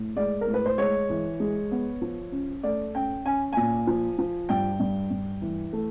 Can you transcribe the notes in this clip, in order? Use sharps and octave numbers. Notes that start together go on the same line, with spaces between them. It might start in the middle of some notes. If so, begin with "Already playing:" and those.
Already playing: A2
G#3 D5
A#4
A2
B4
C5
G#3 C#5
E3
G#3
B3
F3
C#4
A3 D5
C#4 G5
C#4 G#5
A#2 G#5
F3
F3
G2 G5
G2
G2
E3
A3